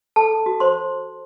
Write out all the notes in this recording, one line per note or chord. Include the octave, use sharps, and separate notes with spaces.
A4 A5
A4
F#4
C5 C6